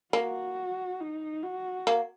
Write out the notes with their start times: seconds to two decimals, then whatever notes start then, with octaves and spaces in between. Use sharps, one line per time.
0.13 A#3 F#4
1.00 D#4
1.43 F#4
1.87 A#3